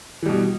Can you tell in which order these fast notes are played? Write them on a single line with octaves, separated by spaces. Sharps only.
E3 G3 B2